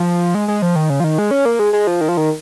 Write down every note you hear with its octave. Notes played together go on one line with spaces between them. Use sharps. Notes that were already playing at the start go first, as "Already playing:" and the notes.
Already playing: F3
G#3
G#3
F3
D#3
C#3
F3
D#3
G#3
C#4
A#3
G#3
G#3
F3
D#3
F3
D#3